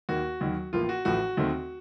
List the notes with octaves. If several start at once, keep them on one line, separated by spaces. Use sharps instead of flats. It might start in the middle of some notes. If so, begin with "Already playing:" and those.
D#2 D#3 A#3 F#4
D#2 D#3 F#3
A1 A2 F3 A#3 F4
F#4
A1 A2 F3 A3 F#4
D#2 D#3 A3 C4